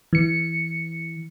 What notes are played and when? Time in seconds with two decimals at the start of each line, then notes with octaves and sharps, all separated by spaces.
0.13 E3 C#7